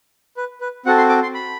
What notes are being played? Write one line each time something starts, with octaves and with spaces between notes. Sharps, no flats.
B4
B4
C4 F#4 A4 F#5
C6
D6
C6
B5